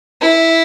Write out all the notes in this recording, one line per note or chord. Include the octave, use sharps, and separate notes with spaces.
E4